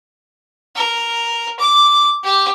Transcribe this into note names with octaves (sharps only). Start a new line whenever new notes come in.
A#4
D6
G4